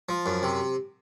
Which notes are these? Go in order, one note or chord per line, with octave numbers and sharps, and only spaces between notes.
F3
F#2
C3